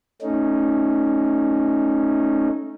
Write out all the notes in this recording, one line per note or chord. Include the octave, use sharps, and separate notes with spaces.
A3 C#4 D#4